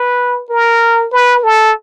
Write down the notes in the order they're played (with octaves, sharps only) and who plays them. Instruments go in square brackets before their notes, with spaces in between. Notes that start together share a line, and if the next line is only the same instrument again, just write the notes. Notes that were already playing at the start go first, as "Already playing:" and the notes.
Already playing: [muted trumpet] B4
A#4
B4
A4